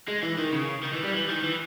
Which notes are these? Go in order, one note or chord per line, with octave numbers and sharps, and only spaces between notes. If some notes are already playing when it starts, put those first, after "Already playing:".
G#3
E3
D#3
C#3
D#3
E3
G3
E3
D#3
E3